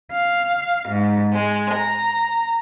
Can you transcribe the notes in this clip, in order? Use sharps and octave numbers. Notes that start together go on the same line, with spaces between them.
F5
G#2
G#3
A#5